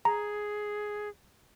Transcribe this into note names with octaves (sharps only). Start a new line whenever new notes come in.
G#4 A#5